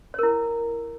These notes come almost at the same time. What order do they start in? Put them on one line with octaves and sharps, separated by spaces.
C#5 A#4 E4